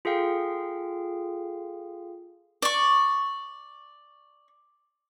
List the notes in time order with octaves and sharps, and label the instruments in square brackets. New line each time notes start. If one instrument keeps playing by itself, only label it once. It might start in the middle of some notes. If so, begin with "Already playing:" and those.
[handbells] F4 G#4 A4 F5 G5
[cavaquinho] D5 C#6